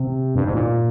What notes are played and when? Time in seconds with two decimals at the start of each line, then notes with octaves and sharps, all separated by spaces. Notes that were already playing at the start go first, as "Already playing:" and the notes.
Already playing: C3
0.35 G2
0.45 G#2
0.54 A#2